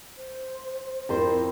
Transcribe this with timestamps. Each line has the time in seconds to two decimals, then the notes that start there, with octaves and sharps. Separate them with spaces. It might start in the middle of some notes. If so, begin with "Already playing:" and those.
0.17 C5
1.09 F2 E4 A#4 C5